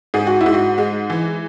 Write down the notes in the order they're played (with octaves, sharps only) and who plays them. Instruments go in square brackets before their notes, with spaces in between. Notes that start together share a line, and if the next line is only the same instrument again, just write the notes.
[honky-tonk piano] G#2 [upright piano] G#4
[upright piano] F#4
E4
[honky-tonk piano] G#2
[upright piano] F#4
[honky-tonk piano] G#3
E3